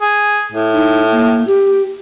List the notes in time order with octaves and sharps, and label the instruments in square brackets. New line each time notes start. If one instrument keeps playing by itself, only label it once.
[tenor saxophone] G#4
A2
[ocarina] D#4
A#3
G4